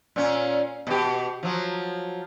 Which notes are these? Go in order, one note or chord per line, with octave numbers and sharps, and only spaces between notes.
A#2 C#4
B2 G4
F3 F#3